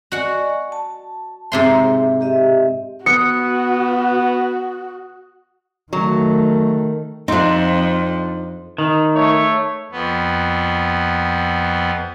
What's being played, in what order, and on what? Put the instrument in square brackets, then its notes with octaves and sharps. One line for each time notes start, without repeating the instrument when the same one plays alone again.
[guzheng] F#4 F#5 [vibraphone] D5 D#5 G#5
[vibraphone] A5
[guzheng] G#2 C3 C6 [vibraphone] E5
[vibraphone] G4 D#5 E5
[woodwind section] B3 [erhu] F#4 [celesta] D#6 F#6 [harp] C#7
[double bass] D#3 A3 [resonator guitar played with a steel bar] F#3
[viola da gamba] F2 [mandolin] C4 D4 [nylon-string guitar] D#4 F4
[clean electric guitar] D#3
[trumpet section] A3 C#5
[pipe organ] F2 B3